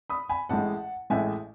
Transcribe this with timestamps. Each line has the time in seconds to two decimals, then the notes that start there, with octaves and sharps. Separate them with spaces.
0.10 B5 D#6
0.29 G#5 B5
0.49 A1 A2 G#3 F#5 A5
1.10 A1 A2 G#3 E5 G#5